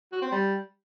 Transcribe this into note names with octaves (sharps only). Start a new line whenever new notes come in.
F#4
C4
G3